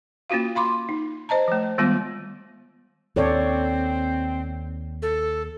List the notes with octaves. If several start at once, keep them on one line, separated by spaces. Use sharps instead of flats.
A#3 C#4 F4 F#4 F5
F5 B5 C6 D6
D#4
C5 D#5 A5 A#5
F3 A3
D#3 G3 G#3 B3 F4
D#2 C4 A4 C#5 D5
A4